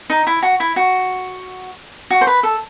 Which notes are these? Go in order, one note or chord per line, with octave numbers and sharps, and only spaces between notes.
D#4
E4
F#4
E4
F#4
F#4
C5
B4
A4